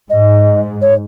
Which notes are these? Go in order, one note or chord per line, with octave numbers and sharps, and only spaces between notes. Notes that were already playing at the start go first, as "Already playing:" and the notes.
G#2 D#5
C#5